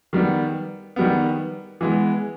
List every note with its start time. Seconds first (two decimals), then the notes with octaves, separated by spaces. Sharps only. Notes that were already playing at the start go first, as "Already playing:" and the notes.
0.13 D#3 G3 B3
0.96 D#3 G3 B3
1.81 E3 G#3 B3